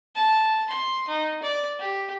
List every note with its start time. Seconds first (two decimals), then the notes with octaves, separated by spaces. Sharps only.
0.15 A5
0.69 C6
1.08 D#4
1.42 D5
1.79 G4